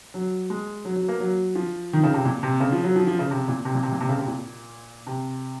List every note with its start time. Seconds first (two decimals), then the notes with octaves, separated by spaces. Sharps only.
0.14 F#3
0.50 G#3
0.85 F#3
0.96 F#3
1.08 A#3
1.20 F#3
1.55 F3
1.93 D#3
2.04 C#3
2.14 C3
2.25 A#2
2.43 C3
2.60 C#3
2.72 F3
2.84 F#3
2.96 F3
3.07 F3
3.19 C#3
3.31 C3
3.48 A#2
3.65 C3
3.75 A#2
3.83 C3
3.92 A#2
4.00 C3
4.09 C#3
4.19 C3
4.27 A#2
5.07 C3